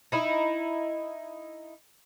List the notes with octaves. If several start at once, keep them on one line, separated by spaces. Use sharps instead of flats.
D#4 E4